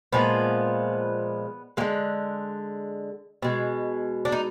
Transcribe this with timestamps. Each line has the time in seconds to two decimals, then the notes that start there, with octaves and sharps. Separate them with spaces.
0.12 A#2 F3 G#3 B3
1.77 G#3 A#3
1.81 D3
3.42 B2 G#3
4.25 D4
4.32 D#4